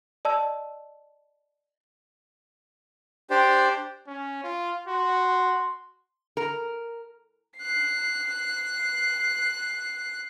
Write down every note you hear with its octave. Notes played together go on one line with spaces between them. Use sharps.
D5 D#5 A5 E6
D4 G4 C5 D5
C#4
F4
F#4 C6
A#4
F#6 C7